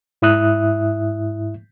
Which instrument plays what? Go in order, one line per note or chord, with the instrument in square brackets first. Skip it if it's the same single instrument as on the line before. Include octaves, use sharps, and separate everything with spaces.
[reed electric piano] G#2 E4 E5 D#6 F#6